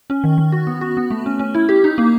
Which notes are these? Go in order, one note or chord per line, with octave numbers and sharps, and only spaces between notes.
C#4
D#3
D#3
F#4
B3
F#4
B3
A3
C#4
C#4
E4
G4
D#4
A#3